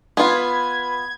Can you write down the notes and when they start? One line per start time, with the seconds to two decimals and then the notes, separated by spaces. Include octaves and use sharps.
0.17 B3 F4 B4 B5 G#6